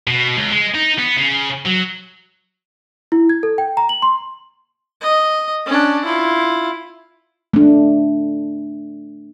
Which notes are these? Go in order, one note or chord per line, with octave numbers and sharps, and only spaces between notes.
B2
C#2
G#3
D#4
B3
C#3
F#3
E4
G#6
A4
G5
A#5
F#7
C6
D#5
C#4 D4
E4 F4
A3 D4